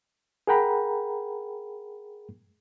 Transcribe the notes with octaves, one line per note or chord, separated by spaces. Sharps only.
G#4 A#4 F#5 G5 A#5 B5